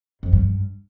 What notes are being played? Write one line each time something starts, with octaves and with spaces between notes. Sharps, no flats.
F2
G2